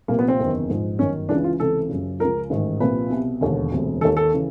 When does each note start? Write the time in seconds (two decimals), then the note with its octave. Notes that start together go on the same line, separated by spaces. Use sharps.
0.08 C2 A#2 F3 A#3
0.19 B3
0.28 C4
0.39 F#1 E2 C3 D#3
0.69 A#1 G#2 F3
0.99 G1 F#2 D#3 C#4
1.29 C#2 C#3 E3 D4
1.44 F4
1.59 C#2 C3 E3 A4
1.90 F#1 F#2 C#3
2.20 C#2 C#3 F3 A#4
2.50 A1 G#2 D#3
2.80 C2 A#2 F3 B4
3.10 C2 B2
3.41 E1 D#2 D3
3.72 E1 D2 C3
4.01 D#3 A4
4.05 D#2
4.17 A4
4.34 C#3 E3